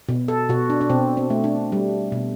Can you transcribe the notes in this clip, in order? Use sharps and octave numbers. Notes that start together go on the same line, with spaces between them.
B2
A4
B2 F#4
D4
D4
B2 C4
C4
A3
D4
G3
B2